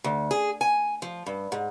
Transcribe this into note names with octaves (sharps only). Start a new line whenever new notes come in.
D2
G#4
G#5
F3
G2
G#2